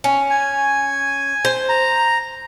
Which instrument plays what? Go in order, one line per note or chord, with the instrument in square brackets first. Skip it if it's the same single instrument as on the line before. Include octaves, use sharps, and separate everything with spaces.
[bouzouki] C#4
[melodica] G#5
[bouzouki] C5
[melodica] A#5